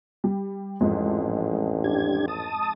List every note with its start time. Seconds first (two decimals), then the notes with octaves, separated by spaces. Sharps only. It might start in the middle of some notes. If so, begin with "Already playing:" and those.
0.24 G3
0.81 A1 F2 G#2 G#3
1.84 D4 G4 G#6
2.28 A5 D#6